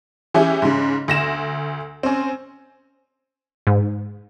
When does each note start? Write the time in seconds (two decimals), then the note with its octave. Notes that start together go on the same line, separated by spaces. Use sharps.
0.34 E3 C#4 E4 G4 G#4
0.62 G#2 C#3
1.08 D2 A#6 E7
2.03 C4 C#4
3.67 G#2